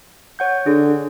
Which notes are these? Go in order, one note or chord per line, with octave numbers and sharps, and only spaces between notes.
C#5 F#5 G6
D3 G#4